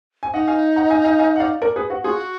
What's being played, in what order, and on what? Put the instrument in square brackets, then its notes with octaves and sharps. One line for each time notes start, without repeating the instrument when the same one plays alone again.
[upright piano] G#5
[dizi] D#4 [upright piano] D#5 F#5
[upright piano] F5 G#5
F#5 A#5
F5 G#5
F5 G#5
F5 G#5
F#5
D5 F5
A#4 D5
G#4 B4
F#4
[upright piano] F4 G#4 [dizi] F#4